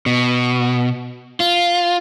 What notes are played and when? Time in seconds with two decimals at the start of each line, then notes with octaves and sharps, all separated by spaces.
0.06 B2
1.40 F4